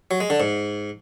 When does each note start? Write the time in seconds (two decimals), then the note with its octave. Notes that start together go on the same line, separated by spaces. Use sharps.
0.11 F#3
0.20 G#3
0.30 D3
0.40 G#2